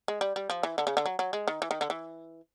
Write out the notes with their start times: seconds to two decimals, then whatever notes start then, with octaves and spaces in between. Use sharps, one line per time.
0.08 G#3
0.21 G3
0.36 G3
0.50 F3
0.63 E3
0.78 D3
0.87 C#3
0.97 D3
1.06 F#3
1.19 F#3
1.33 G#3
1.48 D#3
1.62 E3
1.71 D#3
1.81 D3
1.90 E3